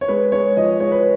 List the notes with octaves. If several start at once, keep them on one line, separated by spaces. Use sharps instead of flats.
C#5
G#3 B4
G#3 C#5
F3 D#5
G#3 C#5
B4